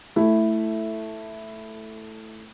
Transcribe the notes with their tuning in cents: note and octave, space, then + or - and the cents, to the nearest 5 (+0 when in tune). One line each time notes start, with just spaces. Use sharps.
A3 +0 E4 +0